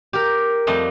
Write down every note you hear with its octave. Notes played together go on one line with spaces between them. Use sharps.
G4 A#4
F2 G3 A3 D#5